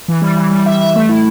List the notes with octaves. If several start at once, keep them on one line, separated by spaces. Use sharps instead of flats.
E3
G3
E3
G3
E5
E5
A3
E4